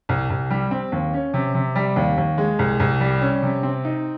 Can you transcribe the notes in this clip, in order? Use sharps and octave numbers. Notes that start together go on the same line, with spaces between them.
C2
C2
G3
C4
D#2
C#4
C3
C3
G3
D#2
D#2
G#3
C2
C2
G3
C#4
C3
C4
D#4